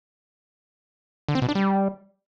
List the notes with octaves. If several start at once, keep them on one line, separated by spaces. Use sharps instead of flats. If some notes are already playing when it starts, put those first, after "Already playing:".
D3
C4
B2
D4
G3